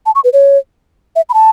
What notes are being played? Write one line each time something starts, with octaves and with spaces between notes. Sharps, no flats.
A5
C#6
B4
C#5
E5
B5
A5